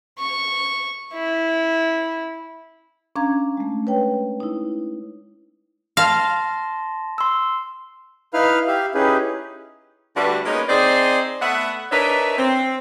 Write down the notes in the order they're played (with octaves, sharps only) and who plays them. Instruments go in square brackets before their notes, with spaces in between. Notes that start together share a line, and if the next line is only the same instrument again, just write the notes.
[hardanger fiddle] C#6
E4
[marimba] C#4 D4 F5 A#5 G#6
G#3 A3
B4 C#5 G5
D#4 E4
[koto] F5 [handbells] A5 C6 A#6
[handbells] C6 E6
[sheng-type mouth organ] D#4 E4 B4 F5 F6
G4 E5 F5
C#4 D#4 E4 G4 G#4 B4
[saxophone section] D3 G3 A3 D4 F#4 B4
G#3 A#3 B3 C#4 D#4
C4 D#4 G#4 C5 D5
A3 B3 E5 F#5
D4 D#4 A#4 B4 C#5 E5
C4